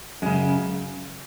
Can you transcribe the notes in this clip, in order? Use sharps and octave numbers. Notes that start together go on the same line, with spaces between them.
F#2 C#3 G#3